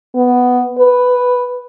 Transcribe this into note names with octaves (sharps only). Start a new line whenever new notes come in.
B3
B4